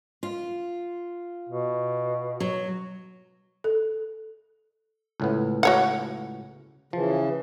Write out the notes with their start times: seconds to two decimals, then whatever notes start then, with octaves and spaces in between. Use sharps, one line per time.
0.23 F4
1.49 B2
2.40 F#3
3.64 A4
5.20 C#2 A2 B3
5.63 F#4 C#5 F#5
6.93 C#3 E3 F3